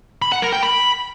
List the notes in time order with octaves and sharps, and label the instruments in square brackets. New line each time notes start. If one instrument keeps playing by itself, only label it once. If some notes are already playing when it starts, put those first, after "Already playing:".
[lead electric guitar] B5
F#5
A#4
G5
B5